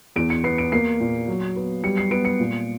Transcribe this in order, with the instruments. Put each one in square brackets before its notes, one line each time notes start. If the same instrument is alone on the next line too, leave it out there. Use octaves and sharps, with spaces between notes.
[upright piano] E2 D7
C#7
B3 C7
D7
A#3 C7
A#2
F#3
B3
G3 C#7
C7
B3 D7
C#7
A#2